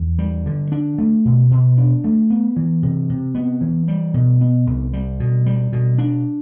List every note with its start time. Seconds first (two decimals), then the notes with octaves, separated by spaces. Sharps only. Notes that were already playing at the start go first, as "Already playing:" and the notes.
Already playing: E2
0.19 G3
0.46 D3
0.72 D4
0.98 A3
1.25 B2
1.51 B2
1.78 D4
2.04 A3
2.30 B3
2.56 E3
2.83 C3
3.10 C3
3.35 B3
3.61 E3
3.88 G3
4.14 B2
4.41 B3
4.67 C2
4.93 G3
5.20 B2
5.46 G3
5.73 B2
5.98 D4